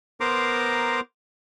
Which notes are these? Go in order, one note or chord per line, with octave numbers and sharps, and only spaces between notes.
B3 A#4 C5 A#5 C6 D6